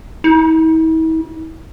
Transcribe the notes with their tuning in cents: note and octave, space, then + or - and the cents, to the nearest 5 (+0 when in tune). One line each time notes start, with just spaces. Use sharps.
E4 -45